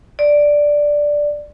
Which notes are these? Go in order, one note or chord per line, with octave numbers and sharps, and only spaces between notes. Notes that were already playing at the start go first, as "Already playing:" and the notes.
D5